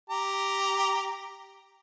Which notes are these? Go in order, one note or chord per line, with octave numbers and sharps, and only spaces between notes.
G4 A#5